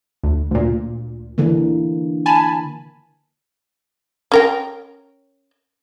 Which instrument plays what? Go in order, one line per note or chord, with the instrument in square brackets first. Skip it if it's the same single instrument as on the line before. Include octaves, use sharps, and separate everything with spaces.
[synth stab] D2
D2 A#2
[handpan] D3 E3 A#3
[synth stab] G#5 A5 B5
[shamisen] C#4 A#4 G5